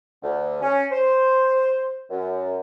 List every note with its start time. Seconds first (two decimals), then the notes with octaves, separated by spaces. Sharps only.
0.22 D2
0.61 C#4
0.91 C5
2.10 F#2